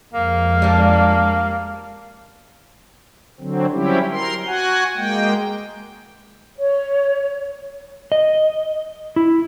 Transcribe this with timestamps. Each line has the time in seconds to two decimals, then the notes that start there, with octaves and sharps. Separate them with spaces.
0.14 F2 G#3 A#3
0.62 G3 D4
3.40 D3 F#3 C4
3.72 F#3 G3 C4 C#4 E4 G4
4.11 A#4 C6
4.47 F#4 F#5 G#5
4.96 G#3 A#3 G5
6.57 C#5
8.12 D#5
9.16 E4